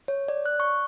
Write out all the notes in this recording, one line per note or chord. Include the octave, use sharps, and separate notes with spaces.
C#5
D5
F#6
C#6